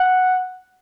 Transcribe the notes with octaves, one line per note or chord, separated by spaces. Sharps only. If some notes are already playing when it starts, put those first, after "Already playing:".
Already playing: F#5